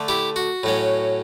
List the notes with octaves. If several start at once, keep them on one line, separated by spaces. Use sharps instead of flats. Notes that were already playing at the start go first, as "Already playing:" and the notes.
Already playing: D3 A3
E4 G4
F#4
A2 F#3 C#4